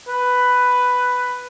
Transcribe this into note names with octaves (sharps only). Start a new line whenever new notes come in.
B4